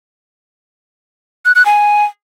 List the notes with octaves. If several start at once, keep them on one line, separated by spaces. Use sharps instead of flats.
F#6
F#6
G#5